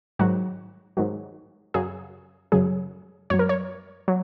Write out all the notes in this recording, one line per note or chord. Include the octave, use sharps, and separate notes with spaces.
G#2 D#3 F#3 F#4
G#2 D#3 F#3
F#2 C#3 F#3 G#4
F#2 C#3 F#3 G#4
F#2 F#3 C#5
A#4
C#5
F#3